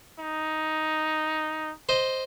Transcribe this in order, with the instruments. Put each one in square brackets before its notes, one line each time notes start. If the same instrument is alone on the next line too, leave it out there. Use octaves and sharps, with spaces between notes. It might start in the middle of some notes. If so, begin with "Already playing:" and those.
[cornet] D#4
[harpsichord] C5 D#5